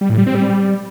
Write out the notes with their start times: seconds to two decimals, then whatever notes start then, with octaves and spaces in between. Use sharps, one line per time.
0.01 G3
0.09 A2
0.18 G3
0.26 C4
0.35 G3